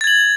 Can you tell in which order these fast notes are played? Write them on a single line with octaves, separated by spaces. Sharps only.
A6 G#6 F#7